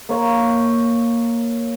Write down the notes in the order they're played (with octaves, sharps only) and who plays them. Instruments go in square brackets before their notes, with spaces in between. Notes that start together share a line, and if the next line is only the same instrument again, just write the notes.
[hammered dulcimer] A#3 C#5